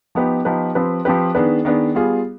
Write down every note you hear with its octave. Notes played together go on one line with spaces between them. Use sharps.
F3 B3 D#4 G4 B4
F3 B3 D#4 G4 B4
F3 C4 G4 B4
F3 C4 G4 B4
D#3 B3 D4 G#4 B4
D#3 B3 D4 G#4 B4
G3 B3 F4 G#4